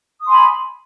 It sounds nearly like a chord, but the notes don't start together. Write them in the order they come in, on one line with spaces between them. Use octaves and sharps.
D#6 C6 G#5 B5